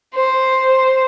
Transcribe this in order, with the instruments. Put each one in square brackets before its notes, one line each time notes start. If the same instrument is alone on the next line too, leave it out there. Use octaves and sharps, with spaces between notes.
[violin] C5